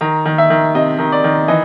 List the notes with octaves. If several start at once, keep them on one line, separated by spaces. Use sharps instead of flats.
D#3 A#5
D#3
E5
D#3
C3 D#5
D#3
D5
D#3
E3 D#5